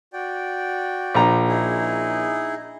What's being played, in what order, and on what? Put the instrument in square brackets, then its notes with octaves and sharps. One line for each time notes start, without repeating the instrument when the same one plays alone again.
[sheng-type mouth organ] F#4 D5 G5
[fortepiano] A#1 A#5
[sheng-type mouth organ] D#4 E4 G#4